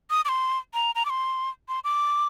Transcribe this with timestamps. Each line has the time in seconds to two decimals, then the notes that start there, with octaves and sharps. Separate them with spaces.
0.10 D#6
0.25 D6
0.29 C6
0.74 A#5
0.95 A#5
1.05 D6
1.10 C6
1.68 C6
1.84 D6